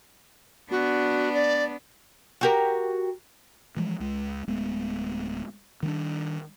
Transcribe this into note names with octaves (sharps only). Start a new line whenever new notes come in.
B3 D4 F#4
D5
F#4 G4 A#4
E3 F3 G#3
C#2 G#3
D1 G#3 A3 B3
D#3 G3 A3 D4